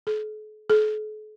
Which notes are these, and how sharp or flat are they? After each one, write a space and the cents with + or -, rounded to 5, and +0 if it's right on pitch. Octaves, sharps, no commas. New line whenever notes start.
A4 -45
A4 -45